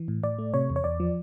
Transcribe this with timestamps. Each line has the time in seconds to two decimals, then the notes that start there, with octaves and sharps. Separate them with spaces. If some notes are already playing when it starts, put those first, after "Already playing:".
Already playing: E3
0.08 A2
0.23 A2 D5
0.39 A3
0.54 C3 C#5
0.70 E2
0.76 C#5
0.84 E2 D5
1.00 F3